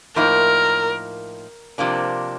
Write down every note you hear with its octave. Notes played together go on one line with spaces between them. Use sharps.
A2 F3 A#3 D#4 A#4
C3 F3 A#3 D4